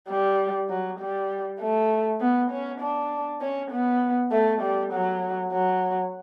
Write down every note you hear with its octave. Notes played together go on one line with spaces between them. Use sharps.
G3
F#3
G3
A3
B3
C#4
D4
C#4
B3
A3
G3
F#3
F#3